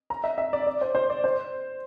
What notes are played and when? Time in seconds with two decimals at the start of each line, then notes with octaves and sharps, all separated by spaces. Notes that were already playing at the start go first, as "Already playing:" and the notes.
0.10 A#5
0.24 E5
0.38 E5
0.53 D5
0.67 D5
0.81 C5
0.95 C5
1.10 D5
1.24 C5